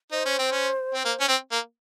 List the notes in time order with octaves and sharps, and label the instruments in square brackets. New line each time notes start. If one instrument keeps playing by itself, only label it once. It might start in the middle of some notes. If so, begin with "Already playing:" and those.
[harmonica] D#4 [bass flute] C5
[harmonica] C#4
C4
C#4
C4
A#3
C#4
C4
A#3